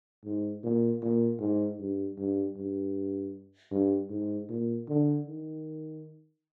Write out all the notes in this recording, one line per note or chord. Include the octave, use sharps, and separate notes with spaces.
G#2
A#2
A#2
G#2
G2
G2
G2
G2
G#2
A#2
D3
D#3